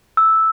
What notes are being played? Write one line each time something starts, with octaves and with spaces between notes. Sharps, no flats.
E6